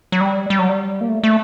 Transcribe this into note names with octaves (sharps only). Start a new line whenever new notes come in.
F#3
G3
G3
F#3
G3
A#3
A3
A3